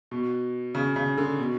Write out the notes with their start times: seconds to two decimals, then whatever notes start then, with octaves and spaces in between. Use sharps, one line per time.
0.11 B2
0.75 C#3
0.96 C#3
1.17 D3
1.38 B2